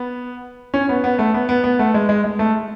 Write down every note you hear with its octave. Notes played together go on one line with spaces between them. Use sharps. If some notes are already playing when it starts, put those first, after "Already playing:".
Already playing: B3
C#4
B3
B3
A3
B3
B3
B3
A3
G#3
G#3
G#3
A3